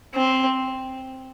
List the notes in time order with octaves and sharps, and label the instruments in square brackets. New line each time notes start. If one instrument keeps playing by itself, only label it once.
[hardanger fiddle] C4